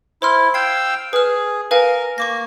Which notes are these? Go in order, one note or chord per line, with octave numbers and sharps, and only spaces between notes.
E4 C5 C6 F6
F5 G5 E6 G#6 C7
G#4 B4 F6
A#4 B4 F5 G#5
A#3 C#6 D6 A#6